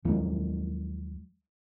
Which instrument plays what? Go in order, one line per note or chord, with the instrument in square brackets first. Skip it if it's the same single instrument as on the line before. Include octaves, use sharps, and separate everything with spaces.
[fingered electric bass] D#2 F3 F#3 G#3